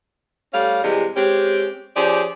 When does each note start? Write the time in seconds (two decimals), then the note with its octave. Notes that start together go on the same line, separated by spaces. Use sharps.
0.53 G3 A3 C#4 F5
0.83 C3 E3 G3 G#3
1.16 G#3 C4 C#4 G4
1.95 F3 C#4 G4 G#4 C5 D5